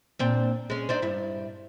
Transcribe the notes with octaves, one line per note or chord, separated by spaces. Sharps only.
A#2 C4 D4
G#3 C#4
C4 D4 D#4
G2 E4